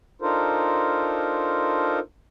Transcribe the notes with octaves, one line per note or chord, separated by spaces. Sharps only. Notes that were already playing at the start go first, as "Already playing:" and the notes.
D4 D#4 F4 A4 A#4 C5